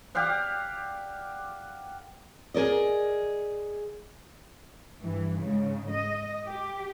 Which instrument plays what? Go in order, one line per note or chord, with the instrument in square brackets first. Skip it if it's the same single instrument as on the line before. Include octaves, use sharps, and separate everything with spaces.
[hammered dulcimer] G4 D5 F5 F#5
[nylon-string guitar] G#4 A#4 D5 D#5
[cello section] G2 E3
G#2 C#3
D#5
G4